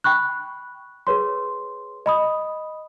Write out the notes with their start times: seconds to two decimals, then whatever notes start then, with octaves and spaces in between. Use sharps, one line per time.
0.04 G5 B5 C#6 F#6
1.07 G#4 B4 C#5 C6
2.06 D#5 B5 D#6